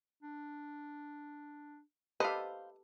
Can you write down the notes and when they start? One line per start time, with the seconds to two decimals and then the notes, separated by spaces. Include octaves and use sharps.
0.23 D4
2.20 G4 A4 B4 C5 D#5 F5